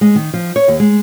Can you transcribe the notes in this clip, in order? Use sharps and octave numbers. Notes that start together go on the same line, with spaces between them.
G#3
D#3
F3
C#5
D#2
G#3